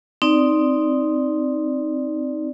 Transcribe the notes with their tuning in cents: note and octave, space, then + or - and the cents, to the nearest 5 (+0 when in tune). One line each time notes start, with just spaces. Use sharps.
C4 +0 D#4 +0 D5 +0